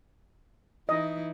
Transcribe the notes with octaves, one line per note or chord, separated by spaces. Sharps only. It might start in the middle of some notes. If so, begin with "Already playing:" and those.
E3 D#4 E4 D#5